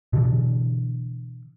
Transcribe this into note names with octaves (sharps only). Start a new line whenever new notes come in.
B2 D3 E3